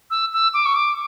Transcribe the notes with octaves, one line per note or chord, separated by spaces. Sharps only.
E6
E6
D6
C#6
D6